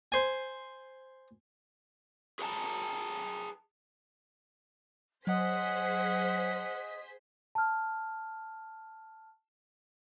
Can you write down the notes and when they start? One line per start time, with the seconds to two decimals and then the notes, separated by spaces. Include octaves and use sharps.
0.12 C5 G#5
2.39 G#4 B4 F#5 A5 A#5
5.27 F#3 G#4 C5 D#5 F#5 B6
7.55 A5 F6